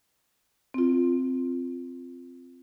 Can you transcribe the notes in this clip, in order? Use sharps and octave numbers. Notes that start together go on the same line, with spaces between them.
C4 F4